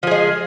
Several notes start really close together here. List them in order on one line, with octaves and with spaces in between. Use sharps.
F3 G#4 G#3